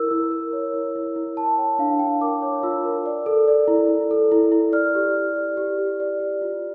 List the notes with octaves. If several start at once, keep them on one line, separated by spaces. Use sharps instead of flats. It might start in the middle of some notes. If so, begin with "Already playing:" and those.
Already playing: E4 A#4 E6
E4
A#4
C#5
E4
E4
E4
A#4 A5
C#5 G5
D4 F5
D4 G5
A#4 D6
C#5
F4 E6
A#4
D5
A4
D5
E4
E4
A4
E4
E4
D5 F6
G4
G4
D5
G4
G4
D5
G4
F4